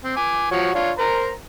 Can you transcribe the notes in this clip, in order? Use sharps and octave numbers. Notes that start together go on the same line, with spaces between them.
C4
G#5 D6
F3 F#4 C#5
D4 F4 C#5
A#4 C5 A#5